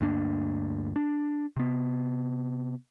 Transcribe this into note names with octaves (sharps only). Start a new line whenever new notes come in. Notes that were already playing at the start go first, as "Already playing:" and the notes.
D2 G2 A#3 D4
D4
C3 B3